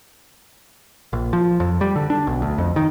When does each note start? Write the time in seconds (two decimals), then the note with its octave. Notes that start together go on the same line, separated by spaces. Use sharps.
1.13 A#1
1.33 F3
1.60 F2
1.81 G3
1.96 D3
2.10 D4
2.27 B1
2.42 D2
2.58 F2
2.76 D#3